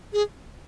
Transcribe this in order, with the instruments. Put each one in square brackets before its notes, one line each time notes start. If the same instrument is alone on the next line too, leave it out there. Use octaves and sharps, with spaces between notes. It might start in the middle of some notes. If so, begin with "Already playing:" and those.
[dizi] G#4